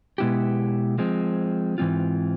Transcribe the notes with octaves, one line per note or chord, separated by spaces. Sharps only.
B2 G#3 B3 E4 G4
F3 G#3 C4
G#2 E3 G3 C4 F4